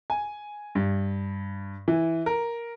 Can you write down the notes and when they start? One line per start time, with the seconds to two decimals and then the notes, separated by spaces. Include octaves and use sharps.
0.10 G#5
0.75 G2
1.88 E3
2.26 A#4